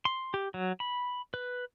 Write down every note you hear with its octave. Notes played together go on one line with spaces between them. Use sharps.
C6
G4
F#3
B5
B4